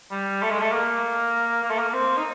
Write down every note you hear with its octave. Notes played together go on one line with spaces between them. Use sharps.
G3
A3
G#3
A3
A#3
A#3
A3
A#3
C4
D#4